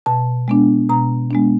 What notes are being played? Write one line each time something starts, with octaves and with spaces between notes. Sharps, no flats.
B2 A5
G#3 B3 D4
B2 A#5
G#3 B3 D4